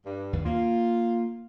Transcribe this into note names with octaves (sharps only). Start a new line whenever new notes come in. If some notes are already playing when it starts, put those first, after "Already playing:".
G2
D#2
A#3 F4